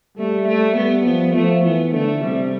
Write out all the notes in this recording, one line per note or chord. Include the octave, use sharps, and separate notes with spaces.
G3 A3
A3
G3 B3
F3 B3
F3 A3
E3 B3
D3 A3
C3 G3